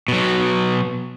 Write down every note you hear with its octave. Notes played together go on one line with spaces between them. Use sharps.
B2 F#3